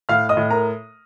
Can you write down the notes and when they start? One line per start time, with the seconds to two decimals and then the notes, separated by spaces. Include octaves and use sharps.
0.09 A2 F5 F6
0.29 D#5 D#6
0.37 A2
0.50 A#4 A#5